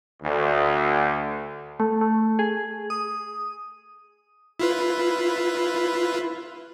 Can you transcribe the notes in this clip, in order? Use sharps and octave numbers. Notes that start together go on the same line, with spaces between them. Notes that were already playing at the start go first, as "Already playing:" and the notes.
D2
A3
A3
G#4
D#6
E4 F4 B4